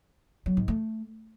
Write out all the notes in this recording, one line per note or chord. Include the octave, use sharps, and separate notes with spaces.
F#3
G#2
A3